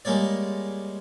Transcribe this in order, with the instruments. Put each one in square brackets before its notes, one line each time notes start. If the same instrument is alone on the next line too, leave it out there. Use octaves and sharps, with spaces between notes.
[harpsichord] G3 G#3 A#3 C#5 D5